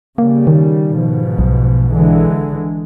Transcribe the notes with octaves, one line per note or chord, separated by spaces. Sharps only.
C#3 G3 A#3
D#3
G#2 B2 F3
B1
D3 E3 G#3